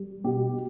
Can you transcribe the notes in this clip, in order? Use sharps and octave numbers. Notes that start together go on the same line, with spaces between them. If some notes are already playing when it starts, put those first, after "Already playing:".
Already playing: G3
B2 G4